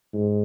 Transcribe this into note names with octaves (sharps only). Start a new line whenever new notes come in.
G#2